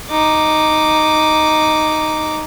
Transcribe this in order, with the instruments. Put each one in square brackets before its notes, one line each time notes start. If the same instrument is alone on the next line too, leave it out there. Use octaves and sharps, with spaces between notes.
[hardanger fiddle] D#4 D6